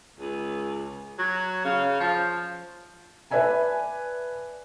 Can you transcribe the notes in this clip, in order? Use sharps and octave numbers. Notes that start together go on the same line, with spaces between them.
C#2
F#3
C#3
F3
B4 D5 E5 G#5 A5